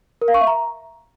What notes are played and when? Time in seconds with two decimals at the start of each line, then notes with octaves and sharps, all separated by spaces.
0.21 A#4
0.28 F5
0.34 C#6
0.41 E5
0.47 A#5